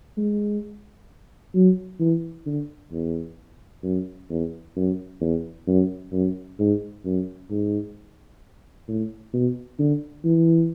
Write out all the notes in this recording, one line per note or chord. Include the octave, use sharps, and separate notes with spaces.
G#3
F#3
E3
D3
E2
F#2
E2
F#2
E2
F#2
F#2
G#2
F#2
G#2
A2
B2
D3
E3